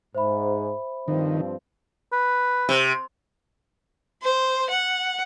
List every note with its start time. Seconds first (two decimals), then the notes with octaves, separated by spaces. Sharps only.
0.15 G#2 C5 E5 B5
1.08 G2 D#3 F3 C4
2.12 B4
2.69 C3
4.22 C5
4.70 F#5